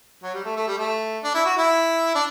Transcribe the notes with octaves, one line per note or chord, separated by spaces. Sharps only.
F#3
G3
A3
A3
G3
A3
D4
E4
F#4
E4
D4